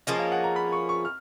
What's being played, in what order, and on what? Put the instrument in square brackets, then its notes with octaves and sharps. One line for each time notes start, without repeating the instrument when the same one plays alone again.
[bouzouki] F3 A#3 C#4 G#4 [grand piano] D#5
[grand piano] F5
F#5
A#5
B5
C#6
C#6
F6